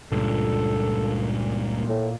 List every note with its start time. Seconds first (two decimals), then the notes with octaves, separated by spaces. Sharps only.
0.12 C#2 G2 A#2 A4
1.89 A2